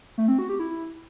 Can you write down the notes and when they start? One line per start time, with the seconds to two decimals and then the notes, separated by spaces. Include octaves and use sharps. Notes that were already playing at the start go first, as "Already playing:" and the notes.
0.18 A3
0.28 C4
0.39 F#4
0.49 G4
0.60 E4